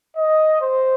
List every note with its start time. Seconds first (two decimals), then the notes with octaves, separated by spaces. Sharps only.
0.17 D#5
0.61 C5